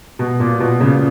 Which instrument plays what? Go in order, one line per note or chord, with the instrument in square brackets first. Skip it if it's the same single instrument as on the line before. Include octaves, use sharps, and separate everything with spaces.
[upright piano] B2
A#2
B2
A#2 C#3